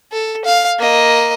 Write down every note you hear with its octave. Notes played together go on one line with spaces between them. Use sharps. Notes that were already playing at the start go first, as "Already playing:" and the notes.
A4
F5
A#3 D#5